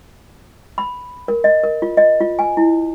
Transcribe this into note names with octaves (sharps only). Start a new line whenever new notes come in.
B5
A#4
D#5
A#4
F4
D#5
F4
G#5
E4